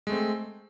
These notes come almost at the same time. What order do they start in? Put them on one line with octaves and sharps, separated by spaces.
G#3 A3 C4